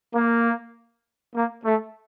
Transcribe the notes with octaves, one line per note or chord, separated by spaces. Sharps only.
A#3
A#3
A3